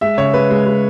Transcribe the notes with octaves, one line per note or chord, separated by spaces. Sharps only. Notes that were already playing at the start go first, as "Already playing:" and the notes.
G#3 E5
C#3 C#5
G#3 B4
G#3
G#3